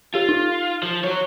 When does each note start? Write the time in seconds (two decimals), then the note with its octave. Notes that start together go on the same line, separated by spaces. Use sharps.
0.15 F4 G4
0.29 D#4
0.83 F3
1.04 F#4 C#5